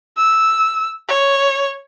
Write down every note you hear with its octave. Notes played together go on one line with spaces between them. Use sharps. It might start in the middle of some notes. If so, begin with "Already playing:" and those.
E6
C#5